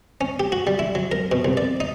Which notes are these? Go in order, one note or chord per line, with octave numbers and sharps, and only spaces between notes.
C#4
G4
F#4
G3
E4
F#3
A#4
B2
C2
D5
D#4